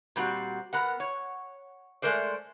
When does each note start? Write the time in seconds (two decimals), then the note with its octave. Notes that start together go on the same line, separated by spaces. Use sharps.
0.16 A#2 G3 C4 F#4
0.73 B3 A#4 F#5
1.00 C#5
2.02 G#3 A3 A#4 C5 D5